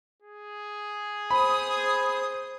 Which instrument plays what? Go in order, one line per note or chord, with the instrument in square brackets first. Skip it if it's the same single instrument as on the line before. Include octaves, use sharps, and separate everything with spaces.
[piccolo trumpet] G#4
[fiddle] C5 D#6 [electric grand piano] B5